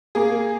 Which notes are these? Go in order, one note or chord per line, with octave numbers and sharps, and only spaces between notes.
A#3 G#4